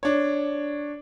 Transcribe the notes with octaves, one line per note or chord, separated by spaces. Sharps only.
D4 C#5